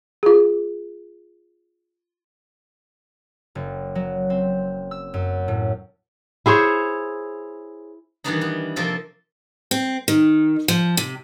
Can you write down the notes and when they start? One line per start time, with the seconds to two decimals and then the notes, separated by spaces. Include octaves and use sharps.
0.23 F4 G#4
3.55 F#1
3.95 F#3
4.30 C4
4.91 E6
5.14 F#2
5.48 A2
6.46 E4 G#4 C5 C#5
8.24 D#3 E3 G3 B3 D4 D#4
8.41 B3
8.76 C3 F3 A#3 A4 D#5 G5
9.71 C4
10.08 D#3
10.68 F3
10.97 C3